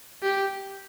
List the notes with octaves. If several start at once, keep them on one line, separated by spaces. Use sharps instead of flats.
G4